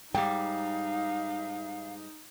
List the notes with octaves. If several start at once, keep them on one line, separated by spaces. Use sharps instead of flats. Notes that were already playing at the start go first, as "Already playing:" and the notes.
G#2 G3 D#4 F5 G5